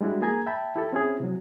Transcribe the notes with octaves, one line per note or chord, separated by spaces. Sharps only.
G3 G#3 D4 E4 F#4
A#3 G#4 G#5 A#5 G#6
E5 G5 A5 B5
E4 G4 A4
C4 C#4 E4 G#4
C3 F#3